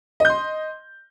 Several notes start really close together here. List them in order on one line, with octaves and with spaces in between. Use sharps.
D#5 G6 C6